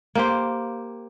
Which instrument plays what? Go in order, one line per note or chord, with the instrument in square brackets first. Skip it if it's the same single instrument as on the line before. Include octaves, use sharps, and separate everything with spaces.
[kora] A#3 G4 C5